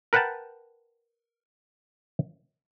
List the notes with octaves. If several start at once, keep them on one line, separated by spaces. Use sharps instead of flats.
A#4 B4 F#5 G5 A5 A#5